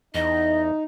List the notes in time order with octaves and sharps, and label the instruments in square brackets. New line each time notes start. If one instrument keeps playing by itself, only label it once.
[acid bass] E2 [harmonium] D#4 [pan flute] D#5